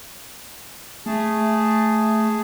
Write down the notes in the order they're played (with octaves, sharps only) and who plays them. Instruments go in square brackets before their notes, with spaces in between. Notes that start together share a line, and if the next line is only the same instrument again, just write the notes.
[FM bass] A3 [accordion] G#4 A5